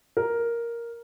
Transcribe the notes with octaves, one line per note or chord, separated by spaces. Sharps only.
A#4